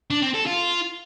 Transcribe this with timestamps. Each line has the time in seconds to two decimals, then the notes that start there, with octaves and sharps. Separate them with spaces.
0.10 D4
0.22 C4
0.34 A4
0.46 F4